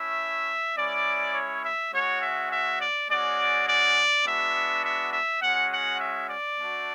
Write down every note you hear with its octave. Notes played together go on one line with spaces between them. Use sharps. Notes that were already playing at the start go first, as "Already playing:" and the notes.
Already playing: A3 C#4 E4 E5
G#3 C#4 E4 D5
C#5
E5
G#3 C#4 F#4 C#5
E5
E5
D5
G#3 C#4 F#4 D5
D5
G#3 B3 D4 F#4 E5
E5
E5
G#3 C#4 F#4 F#5
F#5
E5
D5
A3 D4 F#4